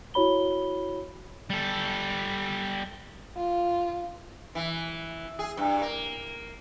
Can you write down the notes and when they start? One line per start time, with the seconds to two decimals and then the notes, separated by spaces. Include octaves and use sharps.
0.14 E4 F#4 C#5 B5 G7
1.50 G3 A4
3.36 F4
4.55 E3
5.39 G#4
5.57 G2
5.82 A#3